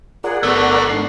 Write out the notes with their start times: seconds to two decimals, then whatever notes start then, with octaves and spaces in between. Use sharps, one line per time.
0.24 F4 G#4 A#4 D5 F#5
0.43 G1 A3 B3 F#4 A4
0.89 G#2 D4 C7